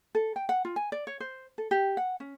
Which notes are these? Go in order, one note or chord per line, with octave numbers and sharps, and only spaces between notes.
A4
G5
F#5
F4
G#5
D5
C#5
C5
A4
G4
F#5
C#4